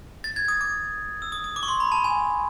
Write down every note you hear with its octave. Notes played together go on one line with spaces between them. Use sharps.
A6
G#6
D#6
D6
E6
D#6
D#6
D6
C#6
C6
B5
A5
G#5